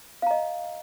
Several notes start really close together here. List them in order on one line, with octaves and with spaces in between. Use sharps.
F5 A#5 D#5